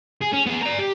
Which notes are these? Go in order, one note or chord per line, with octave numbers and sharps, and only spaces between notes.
G#4
C#4
B3 G#4
D5 A#5
G4